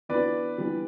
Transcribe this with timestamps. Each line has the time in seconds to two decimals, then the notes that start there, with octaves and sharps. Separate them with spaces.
0.09 E3 B3 D4 F#4 B4 D5
0.58 E3 G3 B3 D4 G4